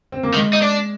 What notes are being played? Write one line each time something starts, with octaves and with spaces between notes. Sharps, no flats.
C4
A#3
D#3 G#3
D#4
D4